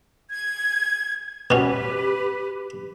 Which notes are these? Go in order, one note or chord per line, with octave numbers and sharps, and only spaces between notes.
G#6
B2 C#4 G4 B4